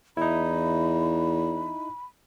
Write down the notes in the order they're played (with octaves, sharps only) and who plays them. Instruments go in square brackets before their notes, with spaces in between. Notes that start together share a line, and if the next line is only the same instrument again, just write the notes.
[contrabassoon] E2 [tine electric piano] D#4 E4 [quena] B5